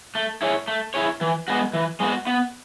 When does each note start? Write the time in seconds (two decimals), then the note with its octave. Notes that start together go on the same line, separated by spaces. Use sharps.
0.15 A3
0.42 E4 G#4 C#5
0.68 A3
0.94 E4 G#4 C#5
1.21 E3
1.48 G#3 B3 F#4
1.73 E3
2.00 G#3 B3 F#4
2.27 B3